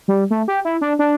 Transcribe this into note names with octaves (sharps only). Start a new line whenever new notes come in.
G3
A3
G4
E4
D4
D4